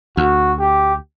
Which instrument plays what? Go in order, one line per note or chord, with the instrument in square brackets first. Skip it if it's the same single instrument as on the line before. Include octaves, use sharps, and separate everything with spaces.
[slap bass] D2 [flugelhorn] F#4
[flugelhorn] G4